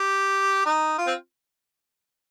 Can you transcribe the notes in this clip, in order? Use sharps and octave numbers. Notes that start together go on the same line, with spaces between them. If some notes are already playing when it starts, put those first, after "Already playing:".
Already playing: G4
D#4
F4
C4